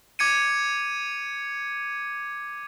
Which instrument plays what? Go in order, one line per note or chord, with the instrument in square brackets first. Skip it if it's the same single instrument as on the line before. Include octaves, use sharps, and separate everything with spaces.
[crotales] D6 G#6 C#7 D#7